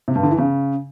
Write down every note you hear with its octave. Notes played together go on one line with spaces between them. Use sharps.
C3
G2
D3
E3
C#3